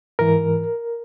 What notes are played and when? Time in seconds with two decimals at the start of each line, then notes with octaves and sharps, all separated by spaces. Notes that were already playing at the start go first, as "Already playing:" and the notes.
0.19 G#2 E3 A#4